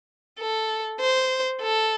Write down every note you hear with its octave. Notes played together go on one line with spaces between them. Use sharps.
A4
C5
A4